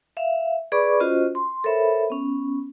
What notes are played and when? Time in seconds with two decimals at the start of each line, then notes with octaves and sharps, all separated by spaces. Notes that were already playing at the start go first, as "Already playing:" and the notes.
0.17 E5 F5
0.72 G#4 B4 D5 B5 C#6 D6
1.00 C#4 F4 F#4 C5 D#5
1.35 C6
1.64 A4 A#4 C5 C#5 E5 B5
2.10 B3 C#4